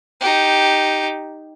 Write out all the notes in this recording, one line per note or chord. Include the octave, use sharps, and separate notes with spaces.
D#4 G4